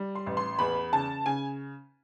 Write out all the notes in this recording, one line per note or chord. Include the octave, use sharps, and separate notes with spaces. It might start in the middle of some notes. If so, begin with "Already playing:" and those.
Already playing: G3
C6
A1
C6
E2 B5
C#3 A5
C#3 G#5